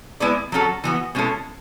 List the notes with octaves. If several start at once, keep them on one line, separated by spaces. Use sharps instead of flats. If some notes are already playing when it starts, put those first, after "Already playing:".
G#3 B3 E4 B4 D5
F#3 C#4 F#4 A4
E3 B3 F#4
B2 G#3 C#4 E4 A4